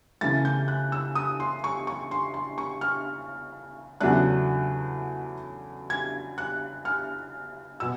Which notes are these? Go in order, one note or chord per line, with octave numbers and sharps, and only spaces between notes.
C#3 E3 A3 A6
G6
F#6
E6
D#6
C6
C#6
C#6
C6
C6
C#6
F6
E2 C#3 F#3 A3 D4 F#6
G#6
F#6
F6
B2 E6